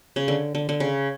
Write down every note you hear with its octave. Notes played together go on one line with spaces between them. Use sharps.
C#3
D3
D3
D3
C#3